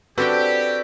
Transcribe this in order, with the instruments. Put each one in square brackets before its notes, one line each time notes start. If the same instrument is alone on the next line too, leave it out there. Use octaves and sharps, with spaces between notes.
[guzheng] C4 D4 G5 [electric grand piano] F#4 A4 B4 [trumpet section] G4